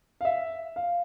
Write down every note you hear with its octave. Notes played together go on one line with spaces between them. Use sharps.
F5
E5
F5